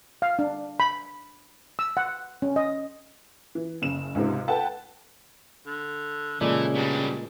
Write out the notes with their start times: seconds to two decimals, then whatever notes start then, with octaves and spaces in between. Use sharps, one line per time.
0.22 F5
0.39 D4
0.80 B5
1.79 E6
1.97 F#5
2.42 C#4
2.56 D#5
3.55 E3
3.82 F#1 C#3 E7
4.15 C#2 G#2 C3
4.48 A4 B4 F#5 G5 A5
5.67 D3
6.41 A#2 C#3 E3 G#3 A3 D5
6.75 G2 B2 G3